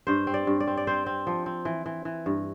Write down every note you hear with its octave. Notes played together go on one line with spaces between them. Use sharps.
G2 C5
C4
D5
G2
D5
C4
D5
C4 C5
C4
F3
C4
E3
E3
E3
G2